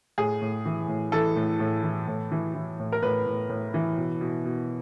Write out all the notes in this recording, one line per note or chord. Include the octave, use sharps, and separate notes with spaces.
A2 G#4
A2
E3
A2
E3 A4
A2
A2
E3
A2
E3
E3
A2
A#4
A2 B4
A2
A2
E3
B2
B2
B2